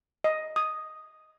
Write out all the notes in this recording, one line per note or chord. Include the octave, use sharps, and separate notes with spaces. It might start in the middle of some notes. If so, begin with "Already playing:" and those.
D#5
D#6